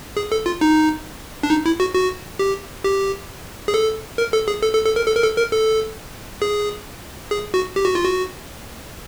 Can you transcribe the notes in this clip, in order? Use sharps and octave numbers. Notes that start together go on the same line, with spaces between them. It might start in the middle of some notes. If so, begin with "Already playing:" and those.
G#4
A4
F4
D#4
D4
D#4
E4
F#4
F#4
G4
G4
G#4
A4
A#4
A4
G#4
A4
A4
A4
A#4
A4
A#4
A4
A#4
A4
G#4
G#4
F#4
G4
F#4
F4
F#4